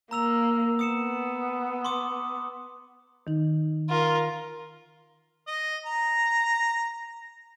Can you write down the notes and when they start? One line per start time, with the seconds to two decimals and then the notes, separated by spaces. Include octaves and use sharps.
0.11 A#3 A#5 E6 F7
0.79 B3 D#6 C#7 E7
1.85 C6 D6 D#6
3.27 D#3 D#4
3.89 F4 A#4
5.47 D#5
5.86 A#5